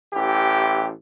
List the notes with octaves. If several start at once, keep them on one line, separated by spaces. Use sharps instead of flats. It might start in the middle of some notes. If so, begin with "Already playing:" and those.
A1 E3 G4